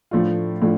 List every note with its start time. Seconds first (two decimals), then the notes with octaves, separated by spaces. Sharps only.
0.11 A2 F3 A3 D4 F4
0.62 A2 F3 A3 D4 F4